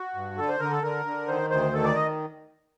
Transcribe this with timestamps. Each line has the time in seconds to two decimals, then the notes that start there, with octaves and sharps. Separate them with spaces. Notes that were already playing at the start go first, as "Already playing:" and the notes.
Already playing: F#4
0.15 G2
0.38 D3 A4
0.49 C5
0.60 D3 A#4
0.71 A4
0.83 D3 A#4
1.05 D3
1.28 D#3 C5
1.50 D2 C5
1.73 D#3 A4
1.84 D5
1.95 D#5